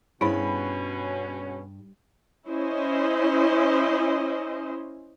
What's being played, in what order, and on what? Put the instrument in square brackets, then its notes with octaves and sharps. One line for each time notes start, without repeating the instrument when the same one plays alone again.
[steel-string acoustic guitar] G2 [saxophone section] B2 C#4 [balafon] E4 C5 [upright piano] G#4 B5
[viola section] C#4 E4 C5 D#5